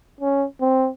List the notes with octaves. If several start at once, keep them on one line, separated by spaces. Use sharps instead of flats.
C#4
C4